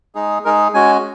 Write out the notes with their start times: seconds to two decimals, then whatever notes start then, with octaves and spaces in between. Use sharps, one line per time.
0.15 G#3 D#4 G#4
0.45 G#3 D#4 G#4 A#4
0.74 G#3 C#4 F#4 G#5